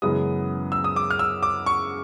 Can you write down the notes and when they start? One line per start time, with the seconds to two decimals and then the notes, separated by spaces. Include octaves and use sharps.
0.02 F#2 C#3 E3 G#3 B3 D#6
0.72 E6
0.84 D#6
0.96 D6
1.10 F6
1.19 E6
1.43 D6
1.66 C#6